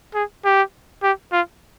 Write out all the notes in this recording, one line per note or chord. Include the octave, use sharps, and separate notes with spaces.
G#4
G4
G4
F4